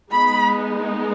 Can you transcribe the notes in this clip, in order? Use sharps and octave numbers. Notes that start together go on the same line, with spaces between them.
G#3 B3 D#4 B5